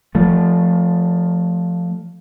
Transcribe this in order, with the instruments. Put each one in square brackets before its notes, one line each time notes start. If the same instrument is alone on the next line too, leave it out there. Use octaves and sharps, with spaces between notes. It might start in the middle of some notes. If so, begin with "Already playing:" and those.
[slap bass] F3 A3